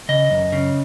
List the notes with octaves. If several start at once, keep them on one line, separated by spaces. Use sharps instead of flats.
C#3 D#5
F#2
C#3